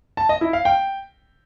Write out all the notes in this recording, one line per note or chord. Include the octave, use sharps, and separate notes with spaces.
A5
D#5
E4
F5
G5